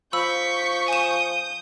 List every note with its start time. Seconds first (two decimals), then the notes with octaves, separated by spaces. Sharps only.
0.13 F3 B5 C#6 E6 G6 B6
0.88 G#5 D#6 G6 E7